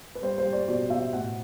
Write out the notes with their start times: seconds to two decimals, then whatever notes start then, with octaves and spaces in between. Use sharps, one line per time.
0.15 B4
0.22 G3 C5
0.38 C5
0.44 G3
0.53 D5
0.68 B2 D5
0.90 B2 E5
1.13 A2 F#5